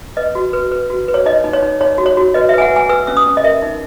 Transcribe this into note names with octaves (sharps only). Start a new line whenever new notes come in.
B4 D#5
F#4
B4
B4
F#4
B4
C#5
D#4 D#5
D#4
C#5
D#4
D#4 C#5
F#4
C#5
F#4
B4 D#5
E5
B4 G#5
F#5
B4
G#5
B4 E6
C#4 E6
D#6
C#4
D#5
A#4 E5
D#4